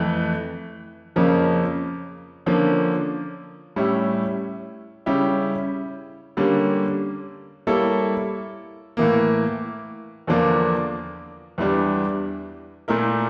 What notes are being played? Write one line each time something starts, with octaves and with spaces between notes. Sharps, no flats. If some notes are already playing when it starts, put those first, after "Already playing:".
Already playing: F2 E3 A3
F2 C#3 F3 A#3 C#4
D3 F3 A#3 C#4
A2 G3 C#4 E4
C#3 G3 C#4 E4 G4
D3 G3 A#3 C#4
G3 A#3 E4 A4 C#5
A2 E3 A#3
E2 D3 F3 A#3 D4
E2 E3 G3 D4
A#2 A3 E4 A#4